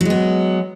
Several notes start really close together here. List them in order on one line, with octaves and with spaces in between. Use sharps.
F#3 G#3 B3